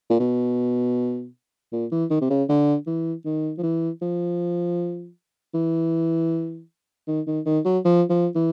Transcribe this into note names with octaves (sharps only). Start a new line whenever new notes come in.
A#2
B2
A#2
E3
D#3
C3
C#3
D3
E3
D#3
F3
E3
F3
E3
D#3
D#3
D#3
F#3
F3
F3
E3